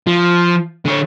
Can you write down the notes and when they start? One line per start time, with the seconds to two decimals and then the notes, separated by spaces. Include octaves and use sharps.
0.07 F3
0.85 D3 C#5